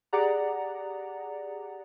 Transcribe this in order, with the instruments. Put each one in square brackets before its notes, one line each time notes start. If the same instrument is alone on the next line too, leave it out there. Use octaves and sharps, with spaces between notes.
[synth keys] G4 G#4 D5 F#5 A#5